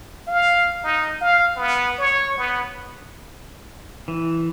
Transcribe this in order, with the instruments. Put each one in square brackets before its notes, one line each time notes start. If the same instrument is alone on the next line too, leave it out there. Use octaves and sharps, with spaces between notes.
[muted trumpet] F5
D#4
F5
B3
C#5
B3
[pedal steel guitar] E3